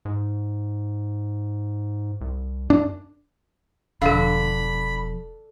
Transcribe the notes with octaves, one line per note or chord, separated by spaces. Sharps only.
G#2
C2
F#2 D4
E1 D3 F3 A4 F5 B5